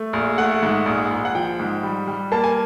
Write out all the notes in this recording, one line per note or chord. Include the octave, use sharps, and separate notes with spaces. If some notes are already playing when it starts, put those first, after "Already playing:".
Already playing: A3
A#1
A3 F#5
G#2
A#1
A#1
F#5
F3 G5
G#2
G3
G3
A#3 A5
G#5